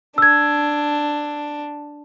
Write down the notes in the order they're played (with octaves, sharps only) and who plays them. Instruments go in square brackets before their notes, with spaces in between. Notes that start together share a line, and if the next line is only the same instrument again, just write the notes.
[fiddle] D4 [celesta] E6 G#6